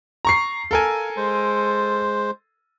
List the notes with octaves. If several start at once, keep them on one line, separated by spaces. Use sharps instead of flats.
A#5 C#6 C7
A4 A#4 F5 G#5
G#3 C5